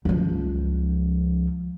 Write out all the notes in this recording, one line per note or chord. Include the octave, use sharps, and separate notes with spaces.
C#2 F3